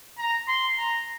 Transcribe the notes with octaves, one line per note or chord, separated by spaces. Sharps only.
A#5
C6
A#5